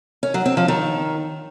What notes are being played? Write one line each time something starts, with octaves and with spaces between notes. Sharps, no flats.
C#4
F#3
C4
F3
D#3